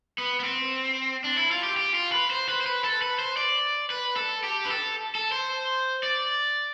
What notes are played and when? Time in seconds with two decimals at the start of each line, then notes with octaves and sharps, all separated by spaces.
0.18 B3
0.40 B3
0.44 C4
1.24 D4
1.37 E4
1.51 F4
1.63 G4
1.77 G4
1.94 F4
2.12 B4
2.30 C5
2.49 B4
2.61 C5
2.66 B4
2.84 A4
3.02 B4
3.19 C5
3.37 D5
3.90 B4
4.16 A4
4.44 G4
4.65 B4
4.70 A4
5.15 A4
5.32 C5
6.03 D5